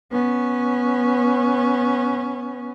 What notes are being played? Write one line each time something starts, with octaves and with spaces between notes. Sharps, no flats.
B3 C#4